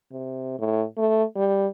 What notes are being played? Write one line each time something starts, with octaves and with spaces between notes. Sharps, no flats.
C3
A2
A3
G3